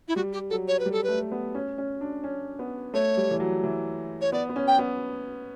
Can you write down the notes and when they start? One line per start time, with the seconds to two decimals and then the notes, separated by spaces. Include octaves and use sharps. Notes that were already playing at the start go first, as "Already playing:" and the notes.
0.08 E4
0.16 G3 F#4
0.33 G4
0.50 F#3 A4
0.68 C#5
0.79 B4
0.86 G3
0.92 A4
1.04 A3 B4
1.32 B3
1.55 C#4
1.78 C#4
2.01 D4
2.24 C#4
2.59 B3
2.94 A3 C#5
3.17 G3
3.31 E3
3.40 F#3
3.63 E3
4.21 C#5
4.32 B3 D5
4.49 B3
4.56 C#4
4.67 G5
4.79 B3